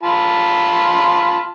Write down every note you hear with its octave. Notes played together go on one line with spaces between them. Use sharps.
F4 A5 B5